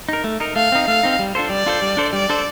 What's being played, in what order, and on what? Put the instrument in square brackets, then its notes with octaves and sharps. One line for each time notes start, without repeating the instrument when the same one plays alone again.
[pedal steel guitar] D#4 A#4
A3
D#4 A#4
[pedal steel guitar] A3 [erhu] F5
[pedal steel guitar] C4 D#4
[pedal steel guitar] A3 [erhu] F5
[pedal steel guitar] C4 D#4
G3
D4 F4 A4 C5
[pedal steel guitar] G3 [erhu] D5
[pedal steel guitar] D4 F4 A4 C5
G3
D4 A4 C5
[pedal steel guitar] G3 [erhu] D5
[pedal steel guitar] D4 A4 C5